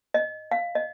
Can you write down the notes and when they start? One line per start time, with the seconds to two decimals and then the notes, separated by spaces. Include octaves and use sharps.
0.14 D#5
0.51 F5
0.75 D#5